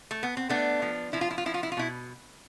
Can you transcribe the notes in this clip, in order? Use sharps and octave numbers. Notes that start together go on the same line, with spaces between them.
A3
B3
C4
A3 B3 D4
F3
F3 E4
F4
E4
F4
F3 E4
F4
E4
F4
B2 E4